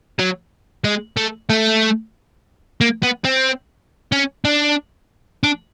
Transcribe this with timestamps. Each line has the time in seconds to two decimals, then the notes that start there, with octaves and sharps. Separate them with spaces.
0.19 F#3
0.84 G#3
1.17 A3
1.50 A3
2.81 A#3
3.03 B3
3.24 C4
4.12 C#4
4.45 D4
5.43 D4